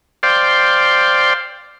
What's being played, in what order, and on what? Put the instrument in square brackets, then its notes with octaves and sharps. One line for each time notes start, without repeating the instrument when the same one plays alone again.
[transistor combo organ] C5 D5 F5 G5